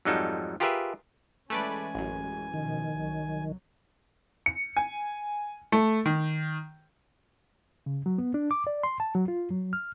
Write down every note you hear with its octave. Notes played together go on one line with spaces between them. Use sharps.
F2 G#2 F#3 G3 D#4 A4
F4 G4 G#4 A#4 B4 E5
E3 G#3 A3 C#4 B4 D5 G#5
A1 F#2
B2 D#3 F3
C2 F#3
C#7
G#5
A3
D#3
C#3
F#3
B3
D4
D6
D5
C6
A5
F#3
F4
F#3
F6